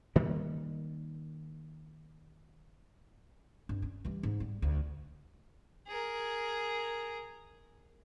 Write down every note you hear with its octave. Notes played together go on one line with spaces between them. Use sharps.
D#3 G3 A#3
G2
C#4
E3 G3
G#2
G3
D2
G#4 A#4